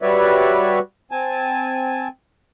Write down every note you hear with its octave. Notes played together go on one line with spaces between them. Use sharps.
G3 F#4 B4 C#5 D5 E5
C4 G#5 A5